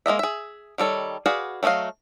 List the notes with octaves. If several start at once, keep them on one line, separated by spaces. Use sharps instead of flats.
G#3 A#3 D#5 E5
G#4 E5
D#3 G3 A4 C#5
F#4 G#4 B4 D5 F5
F#3 A3 E4 D#5 F5